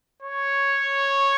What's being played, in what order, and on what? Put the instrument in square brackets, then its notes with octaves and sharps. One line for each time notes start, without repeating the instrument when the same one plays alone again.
[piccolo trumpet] C#5